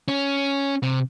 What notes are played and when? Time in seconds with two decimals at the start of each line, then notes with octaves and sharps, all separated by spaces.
0.08 C#4
0.83 C3